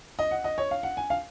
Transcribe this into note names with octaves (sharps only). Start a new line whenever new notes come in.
D#5
F#5
D#5
C#5
F5
F#5
G#5
F5